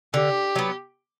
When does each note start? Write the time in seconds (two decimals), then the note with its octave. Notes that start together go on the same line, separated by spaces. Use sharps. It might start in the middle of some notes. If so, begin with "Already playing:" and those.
0.14 D3 G4
0.56 F#3 B3